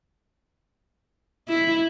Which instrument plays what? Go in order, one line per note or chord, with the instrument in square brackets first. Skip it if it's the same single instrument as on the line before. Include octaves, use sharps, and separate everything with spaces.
[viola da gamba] E4